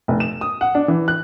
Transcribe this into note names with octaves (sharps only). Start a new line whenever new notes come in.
F1
E7
D#6
F#5
D4
E3
F#6